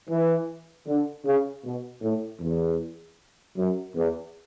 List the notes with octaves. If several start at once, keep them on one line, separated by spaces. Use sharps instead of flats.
E3
D3
C#3
B2
A2
E2
F#2
E2